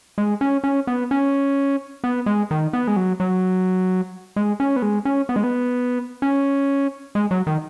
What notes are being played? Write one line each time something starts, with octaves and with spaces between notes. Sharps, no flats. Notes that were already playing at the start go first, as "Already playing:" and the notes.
G#3
C#4
C#4
B3
C#4
B3
G#3
D#3
B3
G#3
F#3
F#3
G#3
C#4
B3
G#3
C#4
B3
G#3
B3
C#4
G#3
F#3
D#3